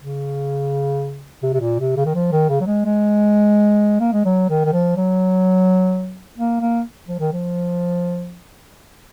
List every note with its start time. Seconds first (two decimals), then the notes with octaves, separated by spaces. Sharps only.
0.01 C#3
1.42 C3
1.53 C3
1.60 A#2
1.79 C3
1.97 C#3
2.05 D#3
2.14 F3
2.32 D#3
2.49 C#3
2.60 F#3
2.66 G#3
2.85 G#3
4.00 A#3
4.13 G#3
4.25 F#3
4.49 D#3
4.65 D#3
4.73 F3
4.96 F#3
6.38 A#3
6.60 A#3
7.08 F3
7.19 D#3
7.32 F3